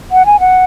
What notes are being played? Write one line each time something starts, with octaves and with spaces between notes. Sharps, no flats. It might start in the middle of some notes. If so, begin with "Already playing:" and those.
F#5
G#5
F#5